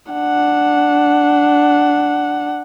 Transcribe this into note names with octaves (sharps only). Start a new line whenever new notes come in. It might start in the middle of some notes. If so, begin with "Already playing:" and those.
D4 F#5